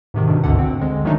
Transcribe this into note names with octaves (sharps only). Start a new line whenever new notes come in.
G#2 C3 D#3
G2 B2 D3 D#3
G#1 D2 D3 F#5
C4
D3 G#3
D#3 F#3 A3 A#3 D4 D#4